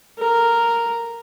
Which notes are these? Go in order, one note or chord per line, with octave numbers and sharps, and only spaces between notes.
A#4